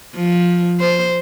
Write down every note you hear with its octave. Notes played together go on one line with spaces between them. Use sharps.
F3
C5